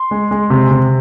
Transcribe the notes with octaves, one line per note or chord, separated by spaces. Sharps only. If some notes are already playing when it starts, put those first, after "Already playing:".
Already playing: C6
G#3
G#3
C3
C3